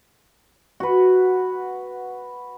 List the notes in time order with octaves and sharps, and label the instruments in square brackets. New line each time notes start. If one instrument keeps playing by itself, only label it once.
[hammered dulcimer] F#4 B4